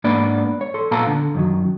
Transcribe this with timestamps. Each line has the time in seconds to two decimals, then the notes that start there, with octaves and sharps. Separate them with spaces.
0.04 G#2 A#3 B3 D4 D5 B5
0.61 C#5
0.74 A4 C6
0.91 A#2 B3 A4 F5 A5 A#5
1.07 D3
1.35 F#2 D#3 F#3